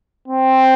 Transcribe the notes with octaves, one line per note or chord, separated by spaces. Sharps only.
C4